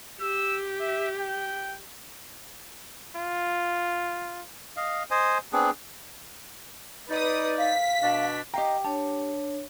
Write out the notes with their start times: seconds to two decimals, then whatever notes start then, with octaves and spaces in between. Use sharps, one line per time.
0.21 G4 E6
0.80 E5
1.18 G5
3.16 F4
4.77 D#5 F5
5.11 C5 D#5 G#5
5.53 B3 C4 D4 G#4
7.09 D#4 B4 D5 D#6
7.58 F5 B6
8.01 B2 D4
8.54 G4 D#5 F5 G5 A#5
8.85 D4 C#5 A5